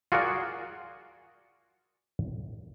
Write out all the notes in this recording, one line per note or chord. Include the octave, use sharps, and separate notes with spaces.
F4 F#4 G#4 A#4 D5 F#5